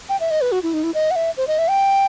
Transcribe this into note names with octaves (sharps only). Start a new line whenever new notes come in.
G5
E5
D#5
B4
F#4
E4
D#4
E4
D#5
F#5
E5
C5
D#5
E5
G5